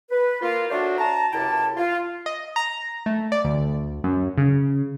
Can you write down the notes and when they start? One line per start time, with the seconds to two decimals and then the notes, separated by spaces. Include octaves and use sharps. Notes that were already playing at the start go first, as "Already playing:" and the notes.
0.11 B4
0.42 A#3 F4
0.70 F#3 A3 D4 F#4 C5 D5
0.98 A5 A#5
1.33 C#2 F#2 C3 E4 G5 A5
1.77 F4
2.26 D#5
2.56 A#5
3.06 A3
3.32 D5
3.45 D2
4.04 F#2
4.38 C#3